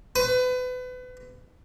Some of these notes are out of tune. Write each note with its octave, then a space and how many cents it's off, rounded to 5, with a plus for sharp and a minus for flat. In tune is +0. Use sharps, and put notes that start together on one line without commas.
B4 +30